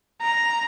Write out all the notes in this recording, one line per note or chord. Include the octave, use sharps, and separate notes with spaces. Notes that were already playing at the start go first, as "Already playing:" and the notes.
A#5